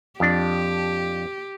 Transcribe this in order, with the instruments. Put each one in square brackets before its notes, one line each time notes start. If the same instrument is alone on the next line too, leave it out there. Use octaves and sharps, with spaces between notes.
[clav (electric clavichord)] F2 D4 [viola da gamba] G4